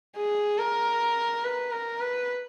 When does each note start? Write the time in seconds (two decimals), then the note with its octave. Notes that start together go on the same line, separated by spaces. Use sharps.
0.17 G#4
0.59 A#4
1.44 B4
1.72 A#4
2.00 B4